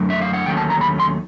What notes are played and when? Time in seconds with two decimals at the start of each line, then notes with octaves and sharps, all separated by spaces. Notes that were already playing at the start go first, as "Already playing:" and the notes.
Already playing: F#2 D3 F#3 A3
0.10 E5
0.21 F5
0.33 F#5
0.46 D#2 D#3 F#3 A3 C#4 G5
0.57 A5
0.70 A#5
0.81 B5
1.00 C6